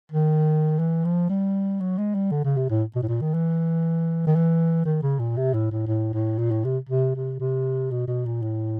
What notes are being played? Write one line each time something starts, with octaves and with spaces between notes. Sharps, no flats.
D#3
E3
F3
G3
F#3
G#3
G3
D3
C#3
C3
A2
B2
A2
A#2
D#3
E3
D#3
E3
D#3
C#3
A#2
C3
A2
A2
A2
A2
A#2
A2
C3
C3
C3
C3
B2
B2
A#2
A2